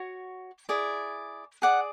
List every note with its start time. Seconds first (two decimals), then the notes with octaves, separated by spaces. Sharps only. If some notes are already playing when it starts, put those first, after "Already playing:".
Already playing: F#4 C#5
0.69 E4 G#4 D5
1.62 G#4 D5 F#5